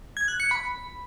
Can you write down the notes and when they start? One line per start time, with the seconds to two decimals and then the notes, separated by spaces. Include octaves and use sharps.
0.17 G#6
0.28 F#6
0.40 C#7
0.51 B5